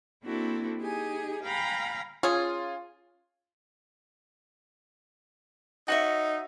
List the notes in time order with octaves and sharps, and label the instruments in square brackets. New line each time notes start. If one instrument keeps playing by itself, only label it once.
[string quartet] A#3 C4 D4 E4 F#4 A4
D#4 G4 G#4 G#5
F5 G5 G#5 A#5 B5
[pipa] C#4 G#4 [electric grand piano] F4
[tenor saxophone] D#4 [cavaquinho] F#4 C#5 E5